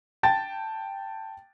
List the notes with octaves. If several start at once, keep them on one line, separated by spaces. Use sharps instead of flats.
G5 A5 A6